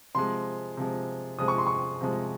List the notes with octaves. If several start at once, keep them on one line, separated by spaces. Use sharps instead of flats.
C3 F3 G#3 C6
C3 F3 G#3
C3 F3 G#3 D#6
C#6
C6
C#6
C3 F3 G#3